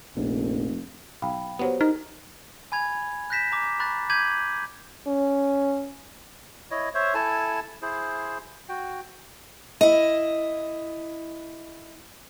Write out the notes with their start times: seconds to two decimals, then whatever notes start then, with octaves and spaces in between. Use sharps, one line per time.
0.16 F1 A#1
1.22 B1 F5 G5 B5
1.59 F#3 B3 G4 C5
1.81 D#4 A#4
2.72 G#5 B5 G#6 F7
3.30 F#6 G6 A#6 B6 E7
3.52 A#5 D6
3.79 A#5 B5 C#6 F#6 A6
4.10 D6 G6 G#6 B6 D#7 F#7
5.07 C#4
6.71 E4 C#5 D#5
6.95 C5 C#5 E5
7.14 E4 A4 G#5 A5
7.82 E4 G#4 C5
8.69 F#4 G5
9.81 E4 D#5